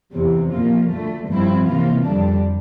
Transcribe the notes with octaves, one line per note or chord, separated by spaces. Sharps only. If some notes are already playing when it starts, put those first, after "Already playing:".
E2 C3 E3
A#2 F3 A#3 F4
D2 D3 A3
G2 F3 C4 E4
C3 E3 A#3 F4
F2 D3 G3 D4